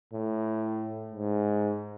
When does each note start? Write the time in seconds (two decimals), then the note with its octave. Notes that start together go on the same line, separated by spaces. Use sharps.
0.13 A2
1.12 G#2